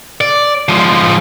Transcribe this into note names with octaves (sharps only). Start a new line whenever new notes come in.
D5
F3 G#3